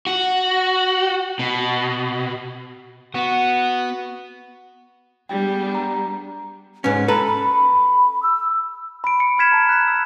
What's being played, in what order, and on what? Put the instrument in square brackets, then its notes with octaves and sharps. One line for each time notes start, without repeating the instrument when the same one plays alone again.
[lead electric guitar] F#4
B2
[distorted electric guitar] B3 [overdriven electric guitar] F#4
[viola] G3 [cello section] B3 D4 G#4 [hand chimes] G5
[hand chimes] A#5
[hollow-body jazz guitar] G#2 C#4 [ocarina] B4
[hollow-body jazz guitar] A4 B4 [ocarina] A#5
[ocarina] B5
E6
[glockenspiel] B5 D7
C#7
B5 F6 G#6 B6 E7
A5 A#5
F#6 B6
E6